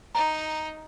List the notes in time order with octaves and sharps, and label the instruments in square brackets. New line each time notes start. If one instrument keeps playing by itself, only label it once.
[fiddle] D#4 [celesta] A#5